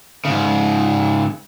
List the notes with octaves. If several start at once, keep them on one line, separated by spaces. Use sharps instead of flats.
G#2 C#3